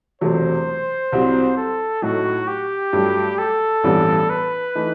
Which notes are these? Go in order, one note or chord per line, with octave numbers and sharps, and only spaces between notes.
E1 E2 C3 F#3 A3 C5
C2 C3 F#3 C4
A4
A2 F#3 A3 D#4 F#4
G4
G2 F#3 A3
A4
A1 G2 E3 G3 B3
B4
E3 A3 D#4